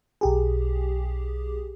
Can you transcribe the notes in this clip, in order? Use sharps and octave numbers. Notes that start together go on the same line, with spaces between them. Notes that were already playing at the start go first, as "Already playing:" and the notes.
B1 G4 G#4